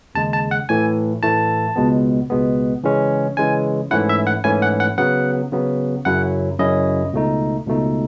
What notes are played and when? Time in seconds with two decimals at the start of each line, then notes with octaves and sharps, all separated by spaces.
0.15 D#2 C#3 G#3 A5
0.33 A5
0.51 F#5
0.69 A2 E3 A3 G#5
1.23 A2 E3 A3 A5
1.76 C#2 B2 G#3 B3
2.30 C#2 B2 G#3 B3
2.84 C#3 E3 G#3 C#4
3.37 C#3 E3 G#3 C#4 G#5
3.91 G#2 E3 A3 C#4 E4 F#5
4.09 E5
4.27 F#5
4.44 G#2 E3 A3 C#4 E4 G#5
4.62 F#5
4.80 F#5
4.98 C#3 F#3 B3 F#5
5.52 C#3 F#3 B3
6.05 F#2 C#3 F#3 C#4 E4 F#5
6.59 F#2 C#3 F#3 C#4 E4 D#5
7.13 C#2 B2 A3 D#4
7.67 C#2 B2 A3 D#4